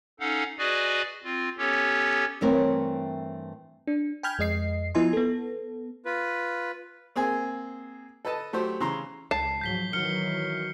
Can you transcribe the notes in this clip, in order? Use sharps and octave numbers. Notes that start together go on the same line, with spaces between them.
C#4 D#4 A4 F5 F#5
F#4 G#4 B4 D5 D#5 G#5
C4 F4
B3 C#4 G4 A4 C#5
G2 E3 A3 C4 A#4 C#5
D4
G5 G#5 B5 F6 G6 G#6
F2 G#3 D#5 C7
F3 B3 E4 D#5 G#5 C6
B3 A4
F4 B4
A#3 C4 G#4 G#5
A4 B4 D#5 A5
F#3 A3 G4 C5
C#3 E3 A#5 C6
C#2 A5 C7
G#2 F3 F#3 G6 B6 G7
D#3 E3 F#3 F6 C#7 G7